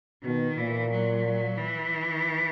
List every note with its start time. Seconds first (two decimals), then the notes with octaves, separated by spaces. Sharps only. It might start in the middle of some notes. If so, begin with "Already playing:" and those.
0.23 B2 D#3
0.57 A#2 E3
0.91 F#3
1.57 E3